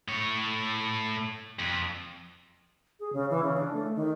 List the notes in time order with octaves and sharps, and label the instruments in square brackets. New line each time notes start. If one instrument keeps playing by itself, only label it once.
[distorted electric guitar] A2 C#5
F2
[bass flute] G#4
C#3
E3
C#3
D4
A3
D#3